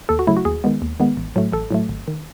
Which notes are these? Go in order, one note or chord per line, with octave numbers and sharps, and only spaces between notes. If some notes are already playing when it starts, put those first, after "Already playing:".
D#2 A4
F#4
C#3 F#3 A3 E4
F#4
D#2 G#4
D#3 G#3 B3
D#2
D#3 G#3 B3
A1
A2 F#3 A3
A1 A4
A2 F#3 A3
G#1
D#3